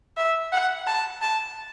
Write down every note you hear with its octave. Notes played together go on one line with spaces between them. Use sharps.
E5
F#5
A5
A5